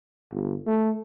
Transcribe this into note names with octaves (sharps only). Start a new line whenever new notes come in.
G1
A3